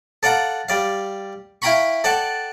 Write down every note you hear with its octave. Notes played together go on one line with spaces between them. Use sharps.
A4 D5 F5 F#5 A#5
G3 D5 F5
E4 F5 G5 A#5 B5 C#6
A4 D5 F#5 G5 A5